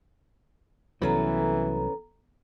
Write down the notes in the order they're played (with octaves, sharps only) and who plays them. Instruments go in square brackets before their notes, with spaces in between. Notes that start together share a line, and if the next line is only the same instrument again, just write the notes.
[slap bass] C2 F#3 [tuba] E3 [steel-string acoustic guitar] B3 C#4 B4 [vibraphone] A4 A#5